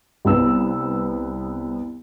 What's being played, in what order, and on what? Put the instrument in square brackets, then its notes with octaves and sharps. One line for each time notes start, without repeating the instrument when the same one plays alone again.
[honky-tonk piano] C2 B3 E6